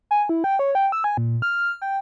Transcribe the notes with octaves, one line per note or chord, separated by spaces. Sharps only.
G#5
E4
G5
C#5
G5
E6
G#5
A#2
F6
G5